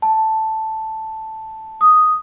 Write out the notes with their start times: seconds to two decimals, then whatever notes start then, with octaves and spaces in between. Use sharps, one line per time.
0.02 A5
1.81 D#6